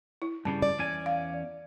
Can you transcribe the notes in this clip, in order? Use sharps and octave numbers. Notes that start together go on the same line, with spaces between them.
E4
G2 C#3 G3 A5
D5
E2 C#4 G#5
F5